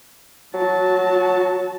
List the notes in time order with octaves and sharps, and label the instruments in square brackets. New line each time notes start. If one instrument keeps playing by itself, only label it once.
[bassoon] F#3 [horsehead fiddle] F#4 A5